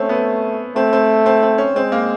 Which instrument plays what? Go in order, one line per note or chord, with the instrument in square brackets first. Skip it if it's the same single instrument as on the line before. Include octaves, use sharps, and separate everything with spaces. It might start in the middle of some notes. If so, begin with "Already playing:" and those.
Already playing: [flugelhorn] A3 [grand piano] C4 C#4
[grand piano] B3
[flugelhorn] A3 [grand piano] C4
[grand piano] C4
C4
C4
C#4
[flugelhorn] G#3 [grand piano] C4
[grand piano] A#3